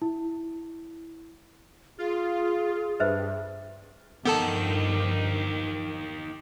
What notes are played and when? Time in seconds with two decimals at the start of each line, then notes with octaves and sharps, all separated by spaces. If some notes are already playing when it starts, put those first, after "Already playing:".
0.02 E4
1.99 F4 G#4
3.00 G2 B4 C5 E5
4.25 G2 D#3 F3 B3 D#4 G4 A4 A5